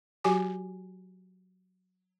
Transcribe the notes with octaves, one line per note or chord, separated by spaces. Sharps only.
F#3 F#4 G4 G#5 D6